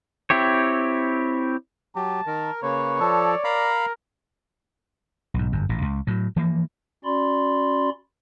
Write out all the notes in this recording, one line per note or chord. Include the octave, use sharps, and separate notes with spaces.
C4 E4 G4 C#5
F#3 G4 A5
D#3 A#4
C#3 A#3 B4 C#5
F3 A4 D5
A#4 F5 A#5 B5
B1 G#2
G1 F#2
A1 A#2
C#2
A2 F#3
E3 F3 A#3
C#4 F#4 D5 B5 C6